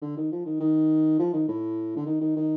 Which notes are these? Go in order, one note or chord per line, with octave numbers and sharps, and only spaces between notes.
D3
D#3
F3
D#3
D#3
F3
D#3
A2
D3
D#3
D#3
D#3